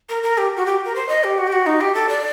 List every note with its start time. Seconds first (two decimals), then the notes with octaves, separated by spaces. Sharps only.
0.09 A#4
0.23 A#4
0.38 G4
0.57 F#4
0.66 G4
0.85 A#4
0.95 C5
1.09 D#5
1.24 G4
1.38 F#4
1.47 G4
1.53 F#4
1.66 D#4
1.81 G4
1.95 A4
2.09 D5